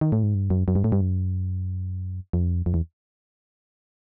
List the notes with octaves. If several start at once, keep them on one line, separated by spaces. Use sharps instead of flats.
D#3
A2
G#2
G2
F#2
F#2
G2
A2
G2
F#2
F2
F2
E2